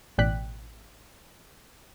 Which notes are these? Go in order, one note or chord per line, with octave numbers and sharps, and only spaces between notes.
A1 B2 D5 G5 F#6 B6